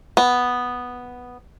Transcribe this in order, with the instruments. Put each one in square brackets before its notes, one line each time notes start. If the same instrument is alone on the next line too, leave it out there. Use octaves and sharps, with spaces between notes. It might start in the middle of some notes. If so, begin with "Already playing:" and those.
[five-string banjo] B3